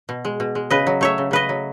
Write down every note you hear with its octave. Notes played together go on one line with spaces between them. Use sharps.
B2
G#3
B2
G#3
C#3 B4 D#5
F#3
A3 C#5 E5
C#3
C#3 B4 D#5
F#3